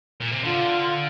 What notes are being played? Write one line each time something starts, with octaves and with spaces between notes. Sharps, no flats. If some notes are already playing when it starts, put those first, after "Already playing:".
A#2
C3
D3 F4